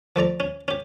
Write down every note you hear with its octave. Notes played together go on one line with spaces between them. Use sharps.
F3 A3 D5 A#5
C#4
C#4 G4